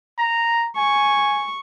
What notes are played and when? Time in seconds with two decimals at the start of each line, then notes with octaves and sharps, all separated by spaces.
0.18 A#5
0.77 G#5 C#6